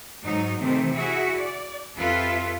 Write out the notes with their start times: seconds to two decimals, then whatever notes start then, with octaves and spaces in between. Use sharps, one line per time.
0.24 G#2 F#3 D#4
0.59 C3 D#3 E3 A3 C4
0.95 E4 F#4 G#4 E5
1.37 D5
1.96 F2 F4 G4 A4 B4 E5